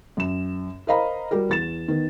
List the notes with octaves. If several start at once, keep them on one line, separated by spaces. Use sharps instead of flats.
F#2 E7
A#4 C5 D#5 F5 A#5 B5
G3 F#4 G4 A#4
E2 A6 E7
D#3 B3